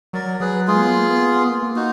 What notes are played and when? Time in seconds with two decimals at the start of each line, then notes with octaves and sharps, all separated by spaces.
0.13 F#3 A#4 D5
0.40 F#3 G#4 B4
0.67 G#3 F4 G#4
0.76 A#3
0.81 B3
0.96 A#3
1.09 B3
1.22 B3
1.35 B3
1.49 A#3
1.62 A#3
1.76 D#4 F#4